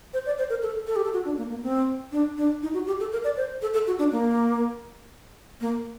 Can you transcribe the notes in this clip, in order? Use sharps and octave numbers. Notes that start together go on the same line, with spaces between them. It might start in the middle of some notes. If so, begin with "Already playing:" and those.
C5
D5
C5
A#4
A4
A4
G4
A4
F#4
D4
A#3
A#3
C4
D4
D4
D#4
F#4
G4
A4
A#4
D5
C5
A4
A4
F#4
D4
A#3
A#3